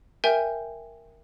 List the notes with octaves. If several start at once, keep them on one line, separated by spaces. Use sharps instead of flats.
A#4 E5 G5 G#5 G6